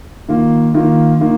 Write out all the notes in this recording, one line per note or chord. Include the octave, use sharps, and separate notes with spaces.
D#3 A#3 F4
D#3 A#3 F4
D#3 A#3 F4